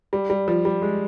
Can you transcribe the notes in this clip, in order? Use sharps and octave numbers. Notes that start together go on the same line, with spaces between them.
G3
G3
F3
G3
G#3